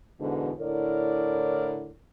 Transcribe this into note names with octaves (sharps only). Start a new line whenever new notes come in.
E2 G#2 B2 D3
A2 D3 E4 A#4 C#5 D5